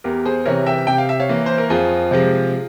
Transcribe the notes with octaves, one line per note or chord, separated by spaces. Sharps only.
E2 G4 A#4
G#4 C5
C3 E3 A#4 C#5
E5 G5
C3 G5
F5
E5
C#5 F5
E3 A#3
C5
A#4
F2 F4 G#4
C3 F3 G#3